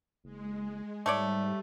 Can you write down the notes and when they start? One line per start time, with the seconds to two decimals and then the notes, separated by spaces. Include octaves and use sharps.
0.24 F#1 G#3
1.06 G#2 G3 A3 C#5 D5